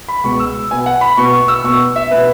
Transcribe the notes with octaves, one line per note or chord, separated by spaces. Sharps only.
B5
C#2 B2 G#3 B3 C#6
E6
B2 B3 G#5
F#5
B5
B2 B3 C#6
C#6
E6
B2 B3 C#6
E5
B2 B3 B4